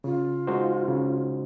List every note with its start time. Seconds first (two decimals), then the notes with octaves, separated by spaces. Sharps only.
0.04 C#3 F4
0.47 G#3 D#4 F#4 C5
0.88 C#3